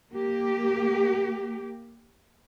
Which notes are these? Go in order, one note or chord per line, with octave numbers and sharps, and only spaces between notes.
A#3 G4